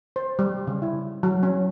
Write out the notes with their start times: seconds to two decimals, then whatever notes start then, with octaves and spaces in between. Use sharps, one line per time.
0.16 C5
0.39 G3
0.67 C#3
0.82 E4
1.23 F#3
1.43 C#4